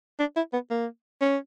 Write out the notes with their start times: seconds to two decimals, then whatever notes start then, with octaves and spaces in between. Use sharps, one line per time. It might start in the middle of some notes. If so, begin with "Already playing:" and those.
0.19 D4
0.36 E4
0.53 B3
0.71 A#3
1.21 C#4